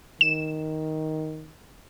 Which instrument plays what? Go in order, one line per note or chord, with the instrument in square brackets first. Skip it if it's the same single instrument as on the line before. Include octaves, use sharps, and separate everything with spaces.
[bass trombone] D#3 [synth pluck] E7